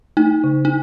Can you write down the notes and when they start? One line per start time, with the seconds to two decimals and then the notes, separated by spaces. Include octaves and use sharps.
0.17 A3 D#4
0.44 C#3
0.65 D#4